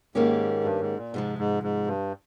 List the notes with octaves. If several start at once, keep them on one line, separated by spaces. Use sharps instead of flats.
G#2 D#3 A#3 C#4 G4
G2
G#2
A#2
G#2 C3 F3 G#3
G#2
G#2
G2